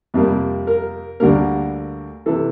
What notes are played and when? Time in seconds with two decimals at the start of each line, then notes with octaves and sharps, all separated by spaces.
0.14 F2 C3 G3 A#3
0.67 A#4
1.20 D2 D3 G3 A#3 A#4
2.26 C3 E3 A4